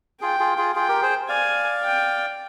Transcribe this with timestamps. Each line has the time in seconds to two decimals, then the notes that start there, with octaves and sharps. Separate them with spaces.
0.21 F4 G#4 G5
0.39 F4 G#4
0.58 F4 G#4
0.75 F4 G#4 G5
0.89 G4 A#4
1.02 G#4 C5
1.29 D5 F5 G#5
1.83 G5